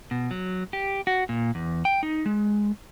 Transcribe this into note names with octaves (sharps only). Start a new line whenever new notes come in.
B2
F#3
G4
F#4
A#2
E2
G5
D#4
G#3